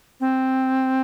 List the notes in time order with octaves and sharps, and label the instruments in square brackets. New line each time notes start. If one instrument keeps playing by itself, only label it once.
[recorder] C4